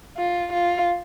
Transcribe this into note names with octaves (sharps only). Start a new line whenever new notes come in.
F4
F4